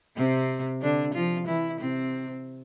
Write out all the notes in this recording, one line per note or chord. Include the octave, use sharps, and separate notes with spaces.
C3 C4
D3 D4
F3 F4
E3 E4
C3 C4